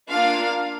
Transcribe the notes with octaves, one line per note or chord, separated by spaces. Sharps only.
A#3 D4 F4 F5